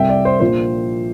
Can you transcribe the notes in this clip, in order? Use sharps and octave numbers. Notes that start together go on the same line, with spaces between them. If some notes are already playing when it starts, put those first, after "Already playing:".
Already playing: C2 C3 G3 E5 G5
D5
C5
A#1 A#2 F3 C5